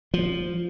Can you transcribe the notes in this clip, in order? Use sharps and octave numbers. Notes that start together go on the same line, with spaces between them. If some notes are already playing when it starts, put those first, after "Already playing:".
F3